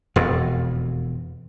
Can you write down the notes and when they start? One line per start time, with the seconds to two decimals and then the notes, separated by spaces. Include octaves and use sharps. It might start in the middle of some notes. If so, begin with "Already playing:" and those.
0.16 E1 F2